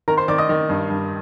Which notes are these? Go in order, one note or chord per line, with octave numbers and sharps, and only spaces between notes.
D#3 A#4 A#5
C5 C6
D#3 D5 D6
D#5 D#6
D#3
G2
G2